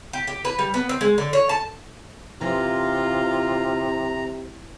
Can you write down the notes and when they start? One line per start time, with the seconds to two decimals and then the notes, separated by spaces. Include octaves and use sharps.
0.13 G4
0.27 G4
0.45 B4
0.59 G3
0.74 B3
0.89 C4
1.01 G#3
1.18 D3
1.33 C#5
1.49 A5
2.41 C3 E3 F4 A#5